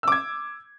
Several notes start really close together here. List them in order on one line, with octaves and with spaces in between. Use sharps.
E6 D6 G#6